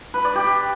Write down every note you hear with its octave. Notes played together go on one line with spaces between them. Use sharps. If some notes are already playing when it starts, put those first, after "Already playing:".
B4
D5
G4